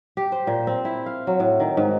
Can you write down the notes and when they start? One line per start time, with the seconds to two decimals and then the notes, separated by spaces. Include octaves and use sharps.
0.17 G4
0.32 C5
0.47 A#2
0.67 C4
0.85 E4
1.06 F5
1.27 F#3
1.40 A2
1.60 D#3
1.77 G#2